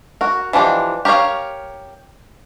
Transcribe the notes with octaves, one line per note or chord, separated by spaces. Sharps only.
F#4 A#4
E3 F3 D4 G4 D#5
G4 A#4 B4 C#5 F5